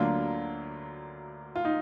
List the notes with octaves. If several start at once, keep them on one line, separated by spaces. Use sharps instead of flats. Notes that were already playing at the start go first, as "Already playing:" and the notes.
Already playing: D2 D3 F#3 A#3 D4 F4
F4
D#4